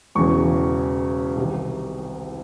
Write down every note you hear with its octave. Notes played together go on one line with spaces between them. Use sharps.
E1 E2 C#3 E3 C#6
C2 C3 D#3